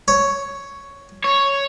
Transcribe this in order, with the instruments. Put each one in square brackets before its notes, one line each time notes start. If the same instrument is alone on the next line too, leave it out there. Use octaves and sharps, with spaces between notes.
[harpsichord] C#5
[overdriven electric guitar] C#5